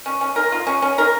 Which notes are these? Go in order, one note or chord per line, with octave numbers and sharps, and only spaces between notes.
C#4
C#4
A#4
F4
C#4
C#4
A#4